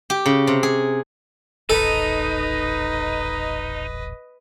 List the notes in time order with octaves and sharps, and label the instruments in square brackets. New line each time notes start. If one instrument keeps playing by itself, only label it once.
[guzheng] G4
C#3
C3
G#4
[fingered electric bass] D#1 A1 [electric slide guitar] D#4 [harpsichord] A4 [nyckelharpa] B4 D#5